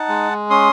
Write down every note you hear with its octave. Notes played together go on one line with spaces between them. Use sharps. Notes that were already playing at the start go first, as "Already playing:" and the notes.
Already playing: D#4 F#5 A5
G#3
C#4 C6 D#6